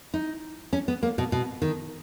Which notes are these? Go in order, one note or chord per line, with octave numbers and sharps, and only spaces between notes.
D#4
C#4
B3
A#3
B2
B2
D#3